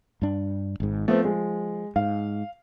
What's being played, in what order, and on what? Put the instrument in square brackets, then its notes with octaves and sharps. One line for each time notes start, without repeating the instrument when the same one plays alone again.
[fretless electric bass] G2 D4
G#1 G#2
[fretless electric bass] F3 [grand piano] A3 B3 C4
[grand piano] G#3
[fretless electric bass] G#2 [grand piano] F5